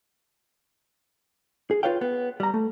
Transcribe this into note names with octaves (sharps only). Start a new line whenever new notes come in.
G#4
F4 B4 C#5 F5 G5
B3
G3 A#5
A3